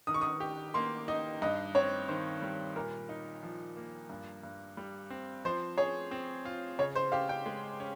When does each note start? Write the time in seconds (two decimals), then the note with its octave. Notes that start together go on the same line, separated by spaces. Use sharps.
0.07 D#3 D#6
0.14 C#6
0.21 D#6
0.40 G4
0.74 A#3 C6
1.08 D#4 D#5
1.42 G2 D#5
1.75 C4 C#5
2.08 D#3 C5
2.42 G3
2.76 A#2 A#4
3.09 D#4
3.43 F3
3.77 A#3
4.10 G2
4.43 G2
4.77 G3
5.10 C4
5.45 F3 C5
5.78 G#4 C#5
6.11 C4
6.45 F4
6.79 C#3 C#5
6.95 C5
7.12 G4 F5
7.29 G5
7.46 G#3
7.80 C#4